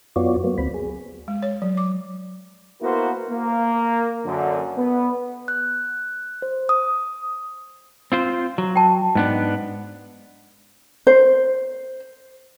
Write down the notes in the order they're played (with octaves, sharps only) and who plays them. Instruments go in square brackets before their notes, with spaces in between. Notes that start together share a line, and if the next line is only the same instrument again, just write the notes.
[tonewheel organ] F#2 B3 F4 F#4 C#5 D5
F#3 A#3 B3
D2 C4 B5
G#4
[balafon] G#3
C#5
F#3
D6
[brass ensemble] A#3 B3 E4 F#4 A#4 C5
A#3
F#2 D3
B3
[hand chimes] F#6
C5
D#6
[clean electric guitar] C4 F4 C5
F#3
[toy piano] G5 A5
[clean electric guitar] G#2 B3 D4
[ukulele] C5